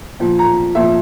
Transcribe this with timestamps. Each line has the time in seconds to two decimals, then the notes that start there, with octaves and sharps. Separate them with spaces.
0.20 A#2 F3
0.39 A#5
0.75 A#2 F3 E5